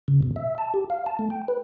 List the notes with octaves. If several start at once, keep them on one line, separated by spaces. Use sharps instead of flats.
C#3
B2
E5
A5
G4
F5
A5
A3
G5
B4